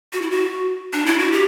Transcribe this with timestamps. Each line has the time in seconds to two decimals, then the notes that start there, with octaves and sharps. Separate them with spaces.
0.13 F#4
0.22 E4
0.31 F#4
0.93 D4
1.06 E4
1.19 F#4
1.32 G4